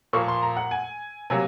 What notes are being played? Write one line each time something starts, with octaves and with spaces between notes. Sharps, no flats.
A#2 F3 A#3 C#6
C6
A#5
F#5
G#5
C3 F#3 A#3 G#5